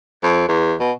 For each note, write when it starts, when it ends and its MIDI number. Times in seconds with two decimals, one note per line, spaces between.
0.23 0.44 41
0.48 0.75 40
0.80 0.92 47